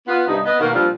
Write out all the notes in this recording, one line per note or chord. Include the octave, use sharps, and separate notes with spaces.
B3 F4
G2 C3 G3 D#4
B3 D#5
B2 D#3 A#3 F#4 A#4 F5
A#2 F3 G3 C4 D4 F4